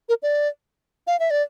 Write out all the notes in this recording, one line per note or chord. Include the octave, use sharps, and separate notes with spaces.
A#4
D5
F5
E5
D5